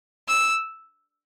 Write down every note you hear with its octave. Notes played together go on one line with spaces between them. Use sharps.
E6